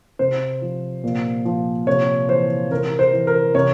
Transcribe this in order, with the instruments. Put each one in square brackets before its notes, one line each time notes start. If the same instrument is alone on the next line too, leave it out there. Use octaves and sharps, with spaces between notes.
[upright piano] C3 C5
F3
A#2
F3
C3 C#5
E3 C5
C3 A#4
C5
E3
A#4
C3 C#5